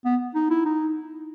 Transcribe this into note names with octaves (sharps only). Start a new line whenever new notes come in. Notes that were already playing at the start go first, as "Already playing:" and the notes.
B3
D#4
E4
D#4